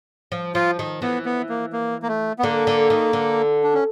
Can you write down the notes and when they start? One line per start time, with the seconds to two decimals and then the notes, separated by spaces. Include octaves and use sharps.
0.32 F3
0.55 F3 F4
0.79 D#3
1.02 E3 B3
1.26 B3
1.49 A#3
1.73 A#3
2.03 A#3
2.08 A3
2.39 B3
2.43 D3 A#3
2.67 D3
2.90 D#3
3.13 D3
3.64 D4
3.74 C#4